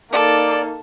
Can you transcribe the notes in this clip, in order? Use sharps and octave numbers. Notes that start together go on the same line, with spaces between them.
A#3 D#4 A4 D5